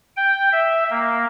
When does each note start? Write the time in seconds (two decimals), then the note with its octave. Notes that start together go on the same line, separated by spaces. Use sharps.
0.16 G5
0.53 E5
0.90 A#3